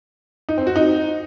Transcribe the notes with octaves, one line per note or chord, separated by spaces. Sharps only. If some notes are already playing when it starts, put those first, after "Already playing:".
D#4
C4
F#4
D#4